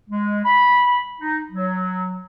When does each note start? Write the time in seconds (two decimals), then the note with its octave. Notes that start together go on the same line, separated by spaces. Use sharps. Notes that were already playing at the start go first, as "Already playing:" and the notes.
0.09 G#3
0.45 B5
1.20 D#4
1.52 F#3